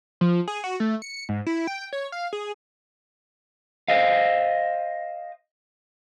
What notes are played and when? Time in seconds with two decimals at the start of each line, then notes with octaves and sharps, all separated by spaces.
0.21 F3
0.48 G#4
0.64 F#4
0.80 A3
1.02 C#7
1.29 G#2
1.46 E4
1.67 G5
1.93 C#5
2.12 F5
2.33 G#4
3.88 C5 D#5 F5